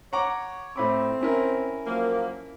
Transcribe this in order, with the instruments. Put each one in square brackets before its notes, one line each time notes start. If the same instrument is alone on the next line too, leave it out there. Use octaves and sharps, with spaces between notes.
[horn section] C#5 [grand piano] F#5 A#5 D6
[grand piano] A2 B5 D6 [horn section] C4
[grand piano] C#4 E4 A#4
[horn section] F3 F#3 A#3